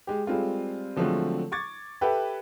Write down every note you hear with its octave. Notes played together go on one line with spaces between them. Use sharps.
G#3 G4
G3 G#3 C4 F4 A4
D3 F3 F#3 G#3 A3 C4
C#6 D6 G#6 A6
G4 A4 B4 E5 G5